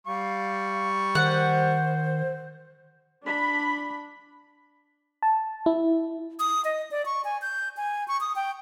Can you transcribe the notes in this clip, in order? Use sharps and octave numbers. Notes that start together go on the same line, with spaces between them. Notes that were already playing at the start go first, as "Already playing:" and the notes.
G3 F5 C#6
D#3 C5 F#5
D4 B5
A5
E4
D#6
D#5
D5
C#6
G#5
G6
G#5
C#6
D#6
G5